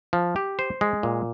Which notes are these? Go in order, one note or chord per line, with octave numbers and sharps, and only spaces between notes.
F3
G4
C5
G#3
A#2